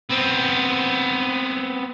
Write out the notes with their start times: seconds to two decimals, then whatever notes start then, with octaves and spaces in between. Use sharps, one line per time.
0.10 B3 C4